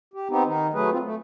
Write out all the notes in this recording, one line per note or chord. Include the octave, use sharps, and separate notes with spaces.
G4
B3 C4 D#4 G4
D#3 D#4
F#3 A3 G#4 B4
C4 F4
A3